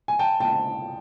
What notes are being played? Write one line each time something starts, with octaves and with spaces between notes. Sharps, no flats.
G#5
G5 A5
G5 A5